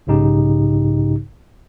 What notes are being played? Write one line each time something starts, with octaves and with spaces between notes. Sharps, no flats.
B1 G#2 C#3 D#4 G4